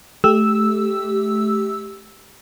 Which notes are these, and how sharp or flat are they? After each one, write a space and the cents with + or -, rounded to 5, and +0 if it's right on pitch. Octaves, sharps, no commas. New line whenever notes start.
A3 -25 G4 +0 E6 -5